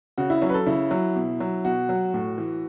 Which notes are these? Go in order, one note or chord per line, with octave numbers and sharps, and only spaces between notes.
C#3 F#4
E4
F#3 C#4
B4
A4
C#3 E4
F#3
B2
F#3
B2 F#4
F#3
A2
E3